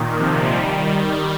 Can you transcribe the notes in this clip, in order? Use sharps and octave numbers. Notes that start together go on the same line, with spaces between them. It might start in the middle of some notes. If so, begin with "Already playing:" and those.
Already playing: A#2 D#3
C3 F3
D#3 G3
D#3 G3